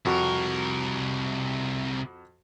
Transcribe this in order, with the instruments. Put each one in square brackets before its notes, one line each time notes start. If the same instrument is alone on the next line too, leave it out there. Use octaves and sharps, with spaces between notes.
[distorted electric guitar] C2 A#4 [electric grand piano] F2 F#4 C#6